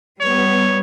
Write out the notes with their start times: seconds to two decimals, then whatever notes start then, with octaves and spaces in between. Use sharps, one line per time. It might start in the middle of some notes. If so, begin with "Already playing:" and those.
0.21 G3 B3 C#5